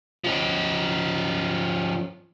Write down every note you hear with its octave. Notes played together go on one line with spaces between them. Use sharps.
F3 C#4